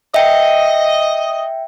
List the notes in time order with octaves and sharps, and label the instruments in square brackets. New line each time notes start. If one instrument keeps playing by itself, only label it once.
[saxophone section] D#5 [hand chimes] E5 G5